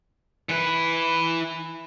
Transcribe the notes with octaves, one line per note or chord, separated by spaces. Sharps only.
E3 B4